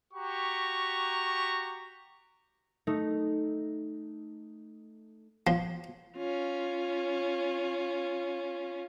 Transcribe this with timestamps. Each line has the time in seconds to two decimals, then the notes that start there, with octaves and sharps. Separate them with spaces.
0.14 F#4 G4 A#5 C#6
2.87 A3 D#4
5.47 F3
6.16 C#4 F4